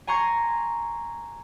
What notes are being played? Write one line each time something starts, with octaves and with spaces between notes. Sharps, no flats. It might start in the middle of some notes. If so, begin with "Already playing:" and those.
G#5 A#5 C6 C#6 G#6